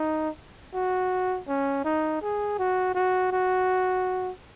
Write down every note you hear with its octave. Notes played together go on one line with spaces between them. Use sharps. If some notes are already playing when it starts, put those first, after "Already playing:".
Already playing: D#4
F#4
C#4
D#4
G#4
F#4
F#4
F#4